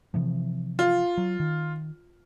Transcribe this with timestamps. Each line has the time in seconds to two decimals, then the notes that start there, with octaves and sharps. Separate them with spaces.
0.14 C3 E3 F3
0.79 F4
1.18 F#3
1.40 D#3